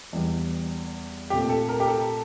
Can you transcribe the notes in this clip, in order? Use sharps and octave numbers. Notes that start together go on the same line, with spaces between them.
E2 E3 G3
A#2 A3 C4 G4
A4
A#4
G4
A4